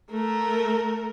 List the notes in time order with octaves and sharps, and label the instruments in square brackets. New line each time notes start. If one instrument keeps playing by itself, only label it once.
[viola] A3 A#4